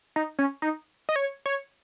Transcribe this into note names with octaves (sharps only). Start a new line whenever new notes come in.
D#4
C#4
D#4
D#5
C#5
C#5